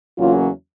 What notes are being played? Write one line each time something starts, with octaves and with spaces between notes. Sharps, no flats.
E2 C#3 F#3 A#3 C#4 F4